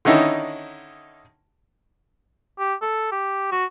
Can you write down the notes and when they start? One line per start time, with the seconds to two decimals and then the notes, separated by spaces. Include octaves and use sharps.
0.05 D3 D#3 C#4 D#4 E4
2.59 G4
2.82 A4
3.12 G4
3.52 F#4